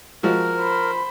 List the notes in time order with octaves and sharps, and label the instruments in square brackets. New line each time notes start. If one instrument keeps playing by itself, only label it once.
[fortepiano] F3 G#3 F#4 [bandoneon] A#4
[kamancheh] C5 B5